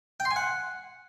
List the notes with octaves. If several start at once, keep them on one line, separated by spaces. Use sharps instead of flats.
G5
C6
G#5
F#5